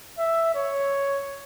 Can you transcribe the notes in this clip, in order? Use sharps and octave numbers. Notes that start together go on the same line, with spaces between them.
E5
C#5